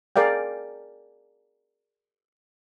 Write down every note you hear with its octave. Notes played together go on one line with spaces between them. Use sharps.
G#4 A#4 D5 F5 G5